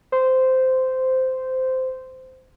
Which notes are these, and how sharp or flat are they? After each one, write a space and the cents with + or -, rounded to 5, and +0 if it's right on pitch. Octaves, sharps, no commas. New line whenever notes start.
C5 -15